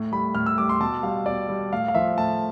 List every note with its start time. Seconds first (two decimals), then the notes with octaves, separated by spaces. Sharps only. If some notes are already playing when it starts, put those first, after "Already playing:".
Already playing: A2
0.12 G3 B5
0.35 A2 F6
0.46 E6
0.58 G3 D6
0.69 C6
0.80 B2 A5
1.03 G3 F5
1.26 B2 D5
1.49 G3
1.73 A2 F5
1.88 F5
1.95 F3 E5
2.18 A2 A5